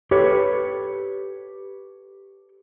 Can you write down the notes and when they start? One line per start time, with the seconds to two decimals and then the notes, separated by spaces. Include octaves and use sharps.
0.11 G4 A4 B4 C#5